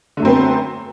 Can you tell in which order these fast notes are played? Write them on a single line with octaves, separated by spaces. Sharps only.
D3 A3 F#2 C4 B3